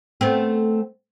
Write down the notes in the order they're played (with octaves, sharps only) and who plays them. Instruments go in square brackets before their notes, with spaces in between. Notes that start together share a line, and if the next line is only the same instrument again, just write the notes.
[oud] A3 B3 C4